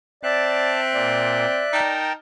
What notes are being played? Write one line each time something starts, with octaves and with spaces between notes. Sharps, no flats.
C4 D5 E5 A5 F#6
A#2 D5
D#4 A#4 G5 A5